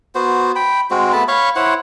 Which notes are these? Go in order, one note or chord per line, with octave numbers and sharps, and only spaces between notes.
B3 F#4 C5
G5 B5
G#3 C4 F#4
A3 B3 A5 B5
C#5 F5 B5 C#6
E4 C5 C#5 F#5